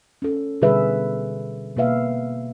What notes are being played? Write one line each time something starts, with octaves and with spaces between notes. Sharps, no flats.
C#4 A4
B2 D3 G3 G#4 B4 E5
B2 A#3 B4 E5 F5